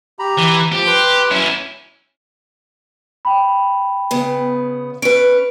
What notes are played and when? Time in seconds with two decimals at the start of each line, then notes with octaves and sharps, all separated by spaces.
0.19 G4 A#5 B5
0.37 E3
0.72 F3 G4
0.87 B4 C6
1.31 F#3 C#4 E4
3.25 G5 B5
4.11 C#3 B3
5.02 C#4 B4 D7